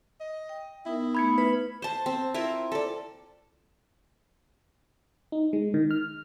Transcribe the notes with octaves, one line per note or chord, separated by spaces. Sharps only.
D#5
G5
B3 D#4 E4 A#4
A3 B3 D#4 B5 G#6 C#7
B4 B5
C5 A5
C4
E4 F4 A#4
A4 D5
D#4
G#3
D#3
F6